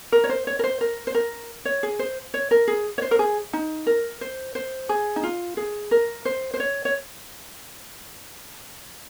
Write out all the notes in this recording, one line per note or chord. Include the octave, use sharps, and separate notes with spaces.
A#4
C#5
C5
C#5
A#4
C5
A#4
C5
A#4
C#5
G#4
C5
C#5
A#4
G#4
C#5
C5
A#4
G#4
D#4
A#4
C5
C5
G#4
D#4
F4
G#4
A#4
C5
C5
C#5
C#5